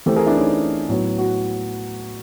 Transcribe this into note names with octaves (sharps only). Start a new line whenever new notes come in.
E3 A3 C4 G4 A4
G#4 A#4
D4 E4
C#4 D#4
A2 F#3 B3
F#4